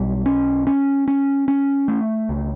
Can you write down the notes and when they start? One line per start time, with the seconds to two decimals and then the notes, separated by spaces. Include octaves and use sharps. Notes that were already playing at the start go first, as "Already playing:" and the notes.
Already playing: B1 G3
0.26 C#4
0.67 C#4
1.08 C#4
1.48 C#4
1.88 A3
2.29 C#2